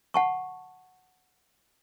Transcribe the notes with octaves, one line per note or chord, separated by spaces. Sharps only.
F#5 A5 C#6